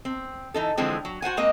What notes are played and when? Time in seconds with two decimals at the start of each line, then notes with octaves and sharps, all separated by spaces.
0.05 C4
0.54 E3 D#4 A4
0.77 D3 E3 F3 G#3 C4
1.05 F#3
1.22 F#4 C5 F#5 G#5
1.37 G#3 A#3 C4 D#5